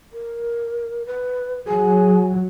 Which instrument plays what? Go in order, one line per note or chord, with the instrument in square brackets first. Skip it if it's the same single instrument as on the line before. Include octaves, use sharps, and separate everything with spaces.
[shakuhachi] A#4
B4
[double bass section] F#3 [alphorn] G#4 [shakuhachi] G#5